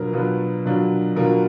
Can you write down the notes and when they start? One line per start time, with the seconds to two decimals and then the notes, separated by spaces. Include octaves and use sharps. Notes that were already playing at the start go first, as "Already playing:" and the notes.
Already playing: B2 F#3 D4 F4 A#4 B4
0.13 B2 F#3 D4 F4 B4
0.65 B2 F#3 D4 F4
1.16 B2 F#3 D4 F4 A#4